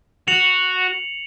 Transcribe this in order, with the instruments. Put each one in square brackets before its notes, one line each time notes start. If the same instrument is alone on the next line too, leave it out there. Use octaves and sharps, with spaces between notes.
[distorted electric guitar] F#4 [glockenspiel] C#7 F7 F#7